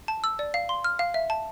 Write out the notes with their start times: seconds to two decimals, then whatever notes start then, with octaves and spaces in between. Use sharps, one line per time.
0.08 A5
0.24 E6
0.39 D5
0.54 F5
0.69 C6
0.84 F6
0.99 F5
1.14 E5
1.30 A5